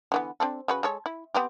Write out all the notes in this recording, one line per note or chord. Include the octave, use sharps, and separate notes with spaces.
D3 E3 B3
C4 D4 A4
C#3 F#4 B4
G#3 A4 C#5
E4
B3 C4 G4